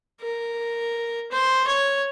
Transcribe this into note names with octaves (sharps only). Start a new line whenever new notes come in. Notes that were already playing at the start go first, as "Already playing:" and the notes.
A#4
C5
C#5